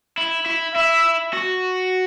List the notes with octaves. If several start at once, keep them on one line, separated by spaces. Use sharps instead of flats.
E4
E4
E4 E5
F#4